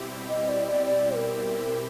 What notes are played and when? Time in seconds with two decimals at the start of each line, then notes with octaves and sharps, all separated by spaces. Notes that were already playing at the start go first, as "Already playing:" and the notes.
Already playing: B2 G3 C4 E4 G4
0.29 D#5
0.48 D5
0.67 D5
0.86 D5
1.15 A#4